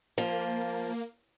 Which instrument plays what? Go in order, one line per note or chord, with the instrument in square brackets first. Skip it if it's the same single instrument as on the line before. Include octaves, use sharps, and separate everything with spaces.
[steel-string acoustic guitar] F3 [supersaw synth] A#3